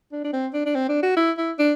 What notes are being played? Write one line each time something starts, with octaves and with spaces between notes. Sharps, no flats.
D4
D4
C4
D4
D4
C4
D4
F#4
E4
E4
D4